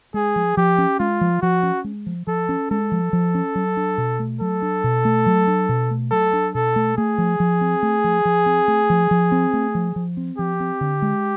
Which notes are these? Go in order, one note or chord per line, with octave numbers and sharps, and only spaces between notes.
G#3 G#4
F3
F3 G4
C#4
G#3 F4
F3
F3 F#4
C#4
G#3
F3
F3 A4
C#4
G#3 A4
F3
F3
C#4
F#3
D4
B2
A3
F#3 A4
D4
B2
A3
F#3
D4
B2
A3
F#3 A4
D4
B2 A4
A3
A3 G#4
F3
F3
C4
A3
F3
F3
C4
A3
F3
F3
C4
A3
F3
F3
C4
F3 G4
C4
D3
G#3